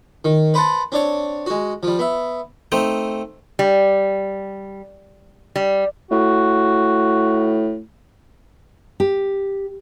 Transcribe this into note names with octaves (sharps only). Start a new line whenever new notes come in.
D#3
B4 C5 F#5 A5
C4 D4 C#5
G#3 F#4
F3 G3
B3 E5
A3 C4 D#4
G3
G3
A2 F#4
G4